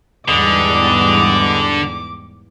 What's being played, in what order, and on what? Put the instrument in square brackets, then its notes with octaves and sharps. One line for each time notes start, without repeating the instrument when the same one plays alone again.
[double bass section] E2 G#2 G3 [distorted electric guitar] D3 [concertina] G#4 B4 D#5 [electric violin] D6